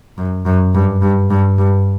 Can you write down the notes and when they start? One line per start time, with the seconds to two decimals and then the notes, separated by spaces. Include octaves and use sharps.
0.17 F#2
0.46 F#2
0.74 G2
1.02 G2
1.30 G2
1.58 G2